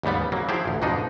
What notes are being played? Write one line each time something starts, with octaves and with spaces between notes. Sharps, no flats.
D#2 G#2 C#3 G3 B3
C#3 F#3 A#3
F3 F#3 E4 G4 G#4 C5
A1 D2
F2 G#2 B2 F3 D4 D#4